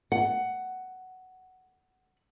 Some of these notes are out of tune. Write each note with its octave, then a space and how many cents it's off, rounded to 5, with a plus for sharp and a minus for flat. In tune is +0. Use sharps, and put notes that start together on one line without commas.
F#5 +10